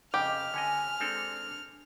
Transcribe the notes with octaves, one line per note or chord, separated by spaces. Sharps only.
F2 C#3 G4 D#5 F6
D3 C#4 D#5 G#5
G#3 C4 D4 A4